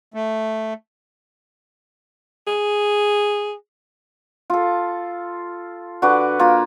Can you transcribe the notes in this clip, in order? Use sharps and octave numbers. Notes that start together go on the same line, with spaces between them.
A3
G#4
F4 A4
D3 F#4 B4 D5
A#3 F4